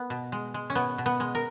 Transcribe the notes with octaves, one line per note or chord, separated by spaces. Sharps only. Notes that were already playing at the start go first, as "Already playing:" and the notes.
Already playing: B3
B2
G#3
G#3
C#4
B2 B3
B2
B3
G#3
A#4